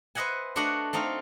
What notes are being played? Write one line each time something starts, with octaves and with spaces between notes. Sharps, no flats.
B4 C5 D#5 E5 F#5 G#5
A3 D4 F#4 D5 D#5 F#5
A3 C4 D#4 F5